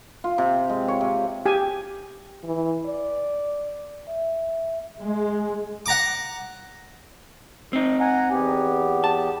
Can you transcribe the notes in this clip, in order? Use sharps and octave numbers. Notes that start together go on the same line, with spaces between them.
F4
C3
G#3
C#5
C3
G4 G#5
E3
D5
E5
G#3
F#5 A#5 D6
C4 D#4
F#5 G#5 A#5
E2 B3 G4
A5